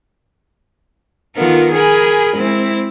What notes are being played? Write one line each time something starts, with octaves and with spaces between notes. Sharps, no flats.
D#3 B3 F4 A4 A#4
G#4 A#4 G#5 B5
G#3 C4 E4